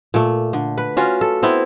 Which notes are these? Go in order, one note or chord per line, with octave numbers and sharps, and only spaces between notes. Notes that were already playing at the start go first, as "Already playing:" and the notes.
A#2 A3
D3
B4
C#4 F4 F#4
A4
B3 C4 E4